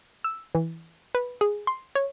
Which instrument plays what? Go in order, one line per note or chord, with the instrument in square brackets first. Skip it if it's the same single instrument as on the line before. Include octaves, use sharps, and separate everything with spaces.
[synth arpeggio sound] E6
E3
B4
G#4
C6
C#5